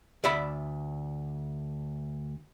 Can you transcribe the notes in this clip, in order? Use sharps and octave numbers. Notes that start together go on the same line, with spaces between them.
D2 D5 E5 B5